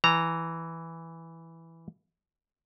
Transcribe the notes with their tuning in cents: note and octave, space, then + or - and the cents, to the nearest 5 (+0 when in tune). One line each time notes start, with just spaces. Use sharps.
E3 +0 A#5 -15